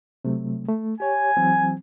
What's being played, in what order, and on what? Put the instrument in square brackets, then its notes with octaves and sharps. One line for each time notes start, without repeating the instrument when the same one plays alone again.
[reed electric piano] C3 F#3 A3
A3
[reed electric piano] G4 C#5 [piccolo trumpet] G#5
[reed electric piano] E3 F#3 C4